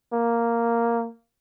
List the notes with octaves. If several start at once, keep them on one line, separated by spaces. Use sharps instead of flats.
A#3